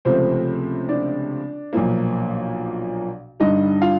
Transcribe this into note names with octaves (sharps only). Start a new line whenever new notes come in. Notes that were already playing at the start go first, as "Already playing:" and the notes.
C#2 C3 F3 A3 C4 C5
D4 D5
B1 A#2 F3 A#3
G2 D3 G3 D#4 D#5
F4 F5